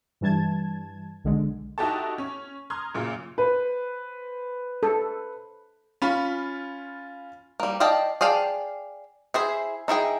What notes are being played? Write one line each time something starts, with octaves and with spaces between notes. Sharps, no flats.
G2 E3 G3 A5 G#6
B1 D3 G#3
D#4 E4 F#4 G4 A4 A5
C#4
A#5 C6 D#6 F6 G#6
F#2 A#2 C#3
B4 C5
A4
C#4 F4 B5
G3 A#3
D5 D#5 F5 G5 A5
G#4 D5 F5 G5 A5
E4 G#4 C5
D#4 E4 G#4 G5